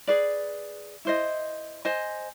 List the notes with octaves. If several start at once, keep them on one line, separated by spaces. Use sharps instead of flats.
G#4 B4 D5
E4 C5 D#5
C5 D#5 G#5